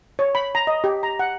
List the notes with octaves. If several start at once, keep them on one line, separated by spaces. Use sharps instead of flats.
C#5
B5
A#5
D#5
G4
A#5
F#5